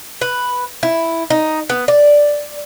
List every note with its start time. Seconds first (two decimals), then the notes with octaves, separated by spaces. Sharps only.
0.21 B4
0.83 E4
1.30 D#4
1.69 B3
1.88 D5